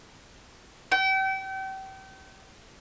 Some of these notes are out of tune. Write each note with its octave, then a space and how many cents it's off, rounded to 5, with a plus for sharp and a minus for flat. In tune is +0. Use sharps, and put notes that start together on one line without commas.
G5 -35